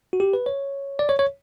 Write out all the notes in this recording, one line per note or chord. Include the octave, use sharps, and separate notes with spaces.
F#4
G4
B4
C#5
D5
C#5
C#5